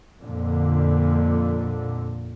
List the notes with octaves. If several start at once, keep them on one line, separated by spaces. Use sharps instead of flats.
F2 A#2 D3